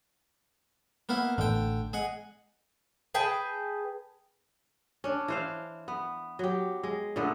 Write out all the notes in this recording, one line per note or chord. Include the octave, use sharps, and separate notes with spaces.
A#3 B3 E4
A1 D3 G5
G#4 D#5 F#5
G#4 B4 G5 A5
C#4 D4
E3 C5 F5
B3
F#3 G4
G#3
A#2 D3 A3 B3